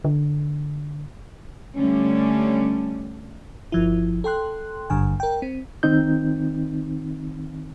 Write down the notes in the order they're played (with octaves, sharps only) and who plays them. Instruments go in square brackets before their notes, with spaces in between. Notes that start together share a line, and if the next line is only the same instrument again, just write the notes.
[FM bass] D3
[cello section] D3 G3 A3 C#4
[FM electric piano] G1 F3 E4
A4 G5 C6 F#6
G#1 G2 D3 G#5
A#4 G5
C4
[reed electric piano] D#3 C4 D#4 G6